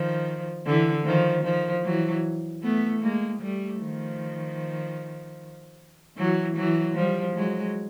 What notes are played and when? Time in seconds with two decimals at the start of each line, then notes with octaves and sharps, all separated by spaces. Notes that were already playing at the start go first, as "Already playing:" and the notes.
Already playing: D#3 F3
0.65 D3 E3
1.05 D#3 F3
1.44 D#3 F3
1.84 E3 F#3
2.62 A3 B3
3.02 G#3 A#3
3.41 G3 A3
3.81 D#3 F3
6.17 E3 F#3
6.56 E3 F#3
6.95 F3 G3
7.35 F#3 G#3